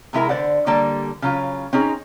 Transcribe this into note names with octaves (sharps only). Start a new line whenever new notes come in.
C3 G#3 E4 A#4
D3 C5 D5 F#5
D3 G3 A#3 A4 D5 A5
C#3 F#3 F4
C4 C#4 D#4 G#4